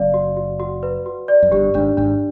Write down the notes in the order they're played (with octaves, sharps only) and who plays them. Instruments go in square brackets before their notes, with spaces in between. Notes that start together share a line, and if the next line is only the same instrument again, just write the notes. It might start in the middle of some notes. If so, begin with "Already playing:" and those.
Already playing: [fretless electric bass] F#1 F#2 [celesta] D5 F5
[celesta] F#4
F#4
F#4
B4
F#4
D5
[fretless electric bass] F#2
[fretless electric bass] G1 G2 [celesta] G4
[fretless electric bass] G#1 G#2 [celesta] D4
[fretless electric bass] G#1 G#2 [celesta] D4